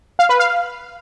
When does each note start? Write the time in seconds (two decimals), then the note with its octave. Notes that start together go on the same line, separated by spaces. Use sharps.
0.19 F5
0.29 B4
0.39 F5